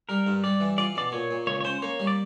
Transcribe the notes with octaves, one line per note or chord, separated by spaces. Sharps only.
G3 A#4
G2
G3 D5
E3
F4 D5
B2 D5
A#2 C#5
A#2
C#2 C#5
C#5
C#4 C5
A#3 C#5
G3
D5